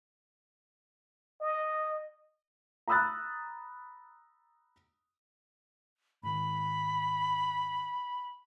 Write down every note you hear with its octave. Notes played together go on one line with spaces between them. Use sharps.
D#5
A#5 B5 D#6 E6 F#6 A6
G#2 D#3 B5